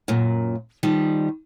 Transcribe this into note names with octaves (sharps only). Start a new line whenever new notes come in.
F#2 A#2
D#3 F3 G3